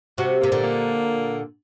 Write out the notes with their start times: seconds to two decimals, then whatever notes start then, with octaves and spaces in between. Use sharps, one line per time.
0.18 C3 F#4
0.41 C3 A#3
0.52 A#2 D3
0.63 A#3